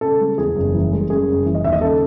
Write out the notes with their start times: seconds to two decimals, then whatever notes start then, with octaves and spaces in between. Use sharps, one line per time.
0.01 C#3 A4
0.20 G#3
0.38 E2 G#4
0.55 F#1
0.74 E3
0.92 G#3
1.10 F#2 G#4
1.28 F#1
1.46 E3
1.55 D#5
1.64 D#2 E5
1.73 D#5
1.81 C#3 A4